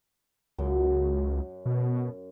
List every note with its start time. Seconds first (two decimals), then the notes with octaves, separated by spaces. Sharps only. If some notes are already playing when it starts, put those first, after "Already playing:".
0.58 C#2 F#2
1.66 B2